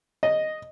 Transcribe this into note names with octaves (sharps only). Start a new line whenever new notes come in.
D#5